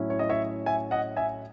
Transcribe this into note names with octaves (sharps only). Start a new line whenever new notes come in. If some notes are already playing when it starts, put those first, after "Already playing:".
Already playing: A2 F#3 C#4 E4
C#5
D#5
C#5 E5
E5 G#5
D#5 F#5
E5 G#5